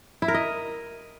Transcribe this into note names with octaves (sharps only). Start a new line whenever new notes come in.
E4
A#4
D#5